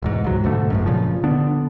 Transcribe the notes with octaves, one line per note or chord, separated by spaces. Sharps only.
E1 E2 G#2
C#2 G#2 F#3
B1 G#2 D3 A3
F#1 B1 F#2
A#2 C#3 F3
D3 B3 D4